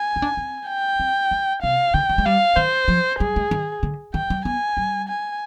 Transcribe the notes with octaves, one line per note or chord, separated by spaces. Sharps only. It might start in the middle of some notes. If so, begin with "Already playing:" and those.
Already playing: G#5
D#4
D4
C4
G5
C4
D3
C3 F5
D3 G5
D#3
G#3
G3 F5
D#3 C5
F3
G3 G#4
G#3
D#3
D3
D#3 G5
G3
B3 G#5
G3
G#5